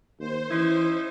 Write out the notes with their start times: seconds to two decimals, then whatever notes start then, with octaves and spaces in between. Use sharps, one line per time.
0.19 D#2 C5
0.50 E3 C#4 D#4 E4